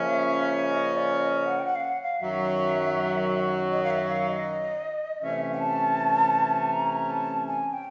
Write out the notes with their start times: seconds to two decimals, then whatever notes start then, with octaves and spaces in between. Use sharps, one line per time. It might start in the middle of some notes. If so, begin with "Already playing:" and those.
Already playing: C#3 F3 A#3 C#4 E5
0.71 D#5
0.97 D5
1.21 D#5
1.46 F#5
1.59 G5
1.65 F#5
1.75 F5
1.84 F#5
2.02 F5
2.21 F#2 D#3 F#3 E5
3.72 D#5
3.84 F5
3.90 E5
4.09 F5
4.28 D#5
5.22 C3 E3 A3 C#4 E5
5.60 A5
6.72 A#5
7.11 A5
7.47 G#5
7.73 G5